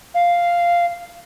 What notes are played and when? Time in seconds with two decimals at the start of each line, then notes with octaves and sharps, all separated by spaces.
0.14 F5